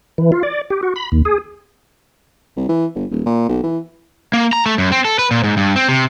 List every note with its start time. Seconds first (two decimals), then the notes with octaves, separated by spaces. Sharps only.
0.18 E3
0.32 F4
0.43 D5
0.70 G4
0.83 F#4
0.96 B5
1.12 D#2
1.25 G#4
2.57 C2
2.69 E3
2.95 G1
3.11 D#1
3.26 A#2
3.49 B1
3.63 E3
4.33 A#3
4.53 A#5
4.66 A3
4.78 F#2
4.92 C4
5.05 A4
5.19 B4
5.31 A#2
5.44 G#2
5.57 G2
5.76 C4
5.89 C3